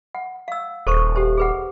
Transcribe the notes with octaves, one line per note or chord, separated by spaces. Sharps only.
F#5
F5 E6
D#1 A4 C5 C#6
G4 A4 C5
G#4 B4 F#5